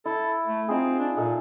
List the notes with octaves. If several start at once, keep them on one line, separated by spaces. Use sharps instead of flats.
E4 A4
A3
C4 D#4 F4 G#4
D4
A#2 D#4 A4